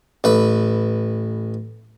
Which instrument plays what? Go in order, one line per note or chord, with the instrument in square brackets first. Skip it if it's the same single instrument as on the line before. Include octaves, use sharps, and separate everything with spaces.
[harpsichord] A1 B4